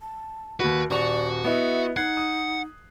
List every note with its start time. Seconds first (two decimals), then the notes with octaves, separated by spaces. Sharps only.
0.01 A5
0.60 D#2 F#4 B4
0.91 D#1 F#4 D5 C#6 F7
1.44 B3 E4 D#5 E5
1.96 D#4 F#5 F#6 G#6 C7
2.17 D#6